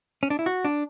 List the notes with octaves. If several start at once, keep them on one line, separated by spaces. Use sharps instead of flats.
C#4
D4
E4
F#4
D4